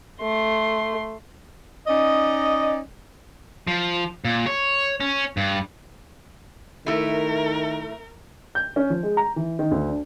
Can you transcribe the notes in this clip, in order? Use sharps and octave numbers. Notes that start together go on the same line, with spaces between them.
A3 C6
C#4 D#4 D5 D#5
F3
A#2
C#5
C#4
G2
D#3 A3 E4 A#4
G6
C#4
F3
G#3
A#5
E3
D#3
D2
D4